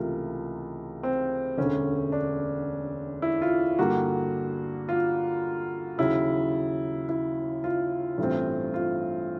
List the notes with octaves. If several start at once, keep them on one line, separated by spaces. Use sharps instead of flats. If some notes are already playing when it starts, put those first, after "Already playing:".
Already playing: C#2 C3 E3 A3 F4 A#4
C4
E1 D2 D3 C#4
D4
E4
F4
G2 D3 G3 A#3 F#4
F4
D#2 C#3 F#3 E4
E4
F4
A1 G2 E3 A3 C4
F4